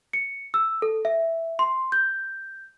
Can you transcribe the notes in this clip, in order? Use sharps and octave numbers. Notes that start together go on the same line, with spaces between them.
C#7
E6
A4
E5
C6
G6